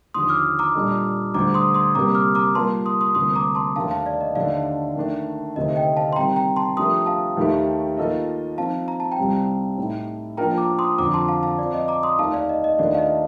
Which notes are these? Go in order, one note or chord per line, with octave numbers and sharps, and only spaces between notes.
D#2 D3 F3 C6 D#6
D6 F6
A#5 D6
A#2 G3 D4 A4 D#5
D2 D3 G3 A#5 D6
C6 D#6
C6 D#6
C3 G3 A#3 A#5 D6
D6 F6
A#5 D6
G3 A#3 F4 A#4 A5 C6
C6 D#6
C6 D#6
D2 C3 G3 A#3 C6 D#6
A#5 D6
A5 C6
D#2 D#3 A3 D4 F5 A5
F5 A5
D5 F5
D#5
D#2 D3 A3 D4 D5 F5
D#3 A3 D4
D2 C3 D#3 A3 C4 D#5
D#5 G5
F5 A5
C6
C3 D#3 G3 C4 G4 G5 A#5
G5 A#5
A5 C6
F3 A3 D4 G4 A#4 C6 D#6
F5 A5
D#2 D#3 A3 D#4 G4
D#3 A#3 F4 A4 D#5
F3 C4 D#4 F5 A5
A#5
A5
G5 A#5
C2 C3 G3 C4
A2 A3 D#4
F3 A#3 D4 F4 A#4 G5 A#5
A#5 D6
C6 D#6
F2 D3 F3 A#5 D6
A5 C6
F5 A5
F5 A5
F3 C4 F4 D5
D#5
A#5 D6
C6 D#6
D#2 D#3 A3 D#4 F5 A5
D5 F5
D#5
D#5
D#2 D#3 A3 D4 F4 D5
F5
D#5